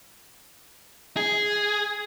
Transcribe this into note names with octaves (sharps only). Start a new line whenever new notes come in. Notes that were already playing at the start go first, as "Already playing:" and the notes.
G#4